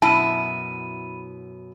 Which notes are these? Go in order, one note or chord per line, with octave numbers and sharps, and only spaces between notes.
F#2 B2 E4 A5 B5 D#7